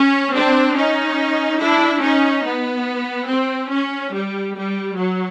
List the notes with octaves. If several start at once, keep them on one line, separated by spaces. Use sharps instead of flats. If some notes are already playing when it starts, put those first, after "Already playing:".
Already playing: C#4
C4 D4
C#4 D#4
D4 E4
C#4 D#4
B3
C4
C#4
G3
G3
F#3